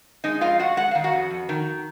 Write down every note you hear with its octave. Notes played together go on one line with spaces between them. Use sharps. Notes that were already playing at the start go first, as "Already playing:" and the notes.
G#3 D#4 D#5
F2 F4 F5
G#3 F#4 F#5
G#3 F#5
D#3 F5
F#4 F#5
F2
F2
D#3